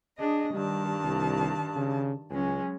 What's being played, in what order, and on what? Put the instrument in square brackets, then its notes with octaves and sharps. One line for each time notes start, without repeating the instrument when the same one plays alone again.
[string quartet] D4 G#4 D#5
[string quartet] G2 D#3 A5 [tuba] G3
[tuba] C2
C#3
[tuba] C#2 [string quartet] F#3 G#3 C#4